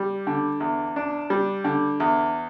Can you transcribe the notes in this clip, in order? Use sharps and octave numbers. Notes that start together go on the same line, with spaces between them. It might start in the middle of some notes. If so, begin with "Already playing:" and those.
Already playing: G3
D3
E2
D4
G3
D3
E2